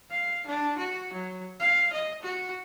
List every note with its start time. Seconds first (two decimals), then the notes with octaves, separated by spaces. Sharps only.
0.11 F5
0.46 D4
0.78 F#4
1.13 F#3
1.59 F5
1.93 D#5
2.22 F#4